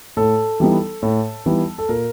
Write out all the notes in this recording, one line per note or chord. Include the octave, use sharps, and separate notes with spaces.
A2 A4
E3 G3 B3 D#4
A2
E3 G3 B3 D#4
A4
A#2 A#4